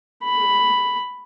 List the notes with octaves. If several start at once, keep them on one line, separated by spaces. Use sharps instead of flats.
B5